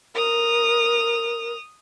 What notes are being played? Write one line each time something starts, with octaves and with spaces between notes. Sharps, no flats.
A#4 D#6 F7